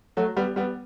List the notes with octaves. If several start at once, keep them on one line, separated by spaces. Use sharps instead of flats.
F#3 A3
G3 B3
G3 B3